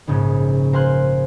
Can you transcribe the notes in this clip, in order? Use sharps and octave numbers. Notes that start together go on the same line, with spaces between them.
A#1 G#2 C#3 C#4
A#4 C5 F5 G#5 C6 F#6